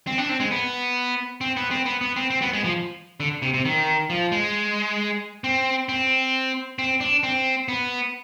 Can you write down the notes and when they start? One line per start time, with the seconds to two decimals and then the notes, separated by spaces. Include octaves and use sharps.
0.07 C4
0.18 D4
0.29 C4
0.40 G#3
0.51 B3
1.41 C4
1.57 B3
1.71 C4
1.86 B3
2.01 B3
2.16 C4
2.30 C4
2.42 B3
2.53 G#3
2.64 F3
3.20 D3
3.42 C3
3.54 C3
3.65 D#3
4.10 F3
4.32 G#3
5.44 C4
5.89 C4
6.79 C4
7.00 D4
7.23 C4
7.68 B3